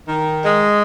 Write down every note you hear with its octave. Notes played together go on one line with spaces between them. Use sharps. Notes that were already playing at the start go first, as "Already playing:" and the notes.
D#3
G#3